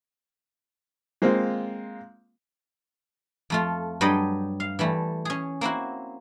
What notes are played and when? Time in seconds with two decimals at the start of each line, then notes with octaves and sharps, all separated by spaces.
1.22 G#3 A#3 C4 F4
3.50 F2 A3 F4
4.01 G2 F#3 G3 D#5 G5
4.60 F5
4.79 E3 G3 A3
5.25 C#4 G#4
5.61 A#3 C4 E4 F#4